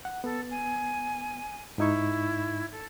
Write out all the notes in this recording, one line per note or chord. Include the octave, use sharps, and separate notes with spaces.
F#5
B3 A4
G#5
G#2 D#4 E4 C#6
A4